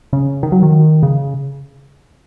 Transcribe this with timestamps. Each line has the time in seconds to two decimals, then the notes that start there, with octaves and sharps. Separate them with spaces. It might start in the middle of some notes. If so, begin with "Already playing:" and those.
0.13 C#3
0.43 D#3
0.52 F#3
0.63 D#3
1.03 C#3